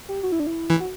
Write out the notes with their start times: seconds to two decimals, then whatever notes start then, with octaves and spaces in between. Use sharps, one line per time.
0.09 G4
0.23 F#4
0.32 E4
0.40 D4
0.47 E4
0.70 E3
0.80 F#4